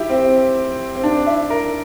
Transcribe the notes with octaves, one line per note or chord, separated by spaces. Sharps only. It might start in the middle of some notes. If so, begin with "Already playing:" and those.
Already playing: E4 G4
C4
C4
D4
E4
A#4